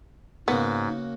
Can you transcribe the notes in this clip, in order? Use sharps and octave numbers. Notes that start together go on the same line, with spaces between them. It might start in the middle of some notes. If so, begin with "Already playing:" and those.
G#2 C#3 A#3 B3 F#4